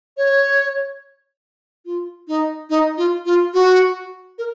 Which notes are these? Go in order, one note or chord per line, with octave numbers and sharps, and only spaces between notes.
C#5
F4
D#4
D#4
F4
F4
F#4
A#4